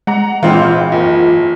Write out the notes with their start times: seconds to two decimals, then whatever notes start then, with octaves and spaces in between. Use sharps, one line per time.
0.07 G#3 F#5 A#5
0.43 G#1 A#2 E3 G#3 C4 F4 F#5
0.92 F#1 F4